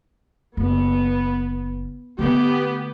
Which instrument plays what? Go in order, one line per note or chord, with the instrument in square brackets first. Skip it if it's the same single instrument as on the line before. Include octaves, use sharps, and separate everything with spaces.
[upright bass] F#1 [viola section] B3
[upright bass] D3 A3 [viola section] B3 G4